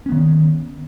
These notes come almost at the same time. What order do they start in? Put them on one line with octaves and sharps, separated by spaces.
C#4 B3 D#3